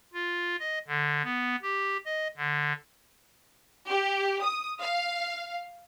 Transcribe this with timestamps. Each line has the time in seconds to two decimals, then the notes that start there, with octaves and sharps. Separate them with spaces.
0.13 F4
0.60 D#5
0.88 D3
1.24 B3
1.62 G4
2.06 D#5
2.37 D3
3.89 G4
4.44 D#6
4.81 F5